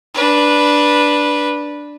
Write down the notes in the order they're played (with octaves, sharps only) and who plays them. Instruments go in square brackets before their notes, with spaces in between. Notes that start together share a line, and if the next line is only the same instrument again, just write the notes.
[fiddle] D4 B4